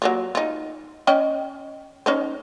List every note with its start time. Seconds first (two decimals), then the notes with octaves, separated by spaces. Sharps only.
0.02 F#3 A#3 F4
0.35 D#4 F4
1.07 C#4 D#5 G5
2.06 C#4 D#4 C5